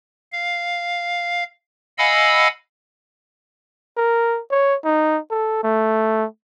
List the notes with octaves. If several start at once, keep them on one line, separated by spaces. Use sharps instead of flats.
F5
D#5 F5 F#5 G#5 B5 E6
A#4
C#5
D#4
A4
A3